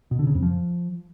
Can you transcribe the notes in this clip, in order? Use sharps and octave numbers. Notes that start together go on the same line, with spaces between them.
B2
D3
C#3
F2
F3